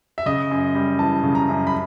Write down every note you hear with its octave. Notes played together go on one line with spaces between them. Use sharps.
E5
C#3 D#5
F#2
G3
E3 A5
C#3
A#5
F#2
B5